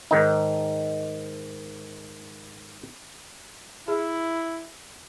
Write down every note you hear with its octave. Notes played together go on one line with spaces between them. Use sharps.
G#2 D#3 D#4
E4 G#4 E5